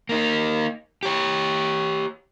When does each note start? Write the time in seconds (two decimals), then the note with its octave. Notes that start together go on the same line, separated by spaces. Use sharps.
0.09 A#3 D#4
1.03 G4 C#5